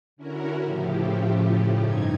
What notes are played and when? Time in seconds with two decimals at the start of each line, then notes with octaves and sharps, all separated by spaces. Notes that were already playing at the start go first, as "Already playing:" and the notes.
0.16 D3 C#4 E4 F#4 A#4
0.63 A2 C#3 F3 A3 G4
1.79 G2 D#4 G#6